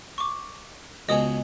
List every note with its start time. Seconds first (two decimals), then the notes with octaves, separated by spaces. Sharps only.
0.18 C#6 D6
1.09 C#2 B2 G#4 D#5 D#6